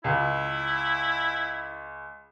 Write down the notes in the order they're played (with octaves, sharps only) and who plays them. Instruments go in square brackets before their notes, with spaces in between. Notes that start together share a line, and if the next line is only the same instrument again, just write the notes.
[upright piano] C#2 [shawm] E4